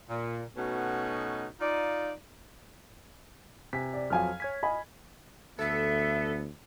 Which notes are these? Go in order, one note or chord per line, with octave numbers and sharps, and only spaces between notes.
A#2
B2 A3 B3 C#4 D#4 F#4
D#4 F4 D5
C3 G#5 B6
D5
F2 F3 F#3 F5 G#5 F6
C#5 G#6 B6
D#5 G#5 B5
D2 B3 A4 E5